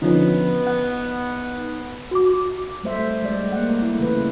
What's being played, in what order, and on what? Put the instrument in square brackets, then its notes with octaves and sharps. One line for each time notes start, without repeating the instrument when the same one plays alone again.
[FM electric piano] D3 F3 C#4 [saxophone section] B3 [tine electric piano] D#4
[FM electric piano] F#5
[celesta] F#4 D6
[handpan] G3 A3 C5 E5
G3 G#3 D5
A#3 F#5
A3 E4
C#3 E3 B4